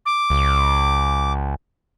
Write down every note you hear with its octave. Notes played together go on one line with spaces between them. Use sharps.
D6
C#2